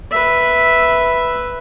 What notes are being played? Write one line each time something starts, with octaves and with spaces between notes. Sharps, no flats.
B4 E5